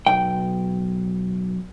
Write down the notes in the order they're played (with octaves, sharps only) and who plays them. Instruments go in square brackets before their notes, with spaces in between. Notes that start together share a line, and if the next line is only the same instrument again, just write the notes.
[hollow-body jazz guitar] B1 G5